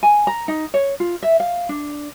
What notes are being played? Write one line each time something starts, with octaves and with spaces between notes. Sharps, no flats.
G#5
A#5
D#4
C#5
F4
E5
F5
D4